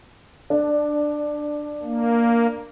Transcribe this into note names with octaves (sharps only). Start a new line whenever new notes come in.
D4
A#3